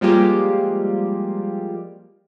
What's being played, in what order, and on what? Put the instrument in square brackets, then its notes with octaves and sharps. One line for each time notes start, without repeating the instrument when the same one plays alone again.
[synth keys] F3 G3 G#3 A#3 F4 G4